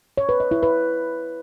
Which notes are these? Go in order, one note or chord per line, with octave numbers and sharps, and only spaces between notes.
C#5
B4
D#5
E4
B4